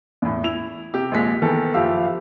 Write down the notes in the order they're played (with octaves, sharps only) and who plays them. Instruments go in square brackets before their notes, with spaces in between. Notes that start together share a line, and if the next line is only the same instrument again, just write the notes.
[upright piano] E2 A2
E4 F7
C3 G4
A#1 D#2 G#3 B6
D#3 E3 B3 A4
F#1 F3 G4 F5 E6